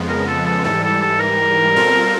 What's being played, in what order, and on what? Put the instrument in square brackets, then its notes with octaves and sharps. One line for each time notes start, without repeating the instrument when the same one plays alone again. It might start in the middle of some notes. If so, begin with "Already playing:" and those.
Already playing: [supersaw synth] F2 C#3 F3 G#3 B3
[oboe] A#4
A4
A4
[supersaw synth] G#2 E3 G3 [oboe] A4
[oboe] A4
A4
A#4
[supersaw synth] B2 G3 C4 F4 A4